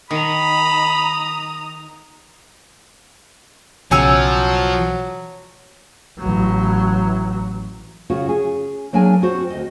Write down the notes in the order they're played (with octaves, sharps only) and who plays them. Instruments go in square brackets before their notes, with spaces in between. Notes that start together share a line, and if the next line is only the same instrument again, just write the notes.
[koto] D#3 [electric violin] A#5 D#6 [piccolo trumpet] B5
[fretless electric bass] B1 C#3 [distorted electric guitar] F3 [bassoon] F#3 [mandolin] C#5 G#5 E6
[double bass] A1 F#3
[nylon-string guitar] C#3 F4 F#4
C#4 G#4
F#3 A#3 D4 G#4 A#4 G#5
C4 F#4 C5
D2 D#5